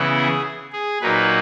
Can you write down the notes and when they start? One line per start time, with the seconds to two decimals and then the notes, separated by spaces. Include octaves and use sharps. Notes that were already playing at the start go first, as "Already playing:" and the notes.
Already playing: C#3 E3 B3 E4
0.16 G#4
0.72 G#4
1.01 A#2 F#3 A#3 D#4 B4